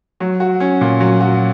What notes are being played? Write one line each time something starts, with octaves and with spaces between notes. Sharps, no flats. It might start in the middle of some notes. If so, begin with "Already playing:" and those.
F#3
F#4
C#4
A#2
F#3
F#4